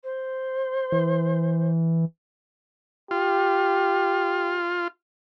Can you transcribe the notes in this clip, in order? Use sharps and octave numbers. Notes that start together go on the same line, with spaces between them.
C5
E3
F4 G4